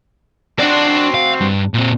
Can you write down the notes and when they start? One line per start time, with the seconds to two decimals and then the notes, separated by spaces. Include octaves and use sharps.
0.59 C4 D4 F#4 D5
1.14 F5
1.41 G2
1.74 A#2 C4